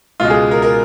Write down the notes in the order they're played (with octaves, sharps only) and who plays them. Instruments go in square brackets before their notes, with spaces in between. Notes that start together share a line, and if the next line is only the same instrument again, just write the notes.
[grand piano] C#2 B2 G#3 F4
G#4
A#4
A#4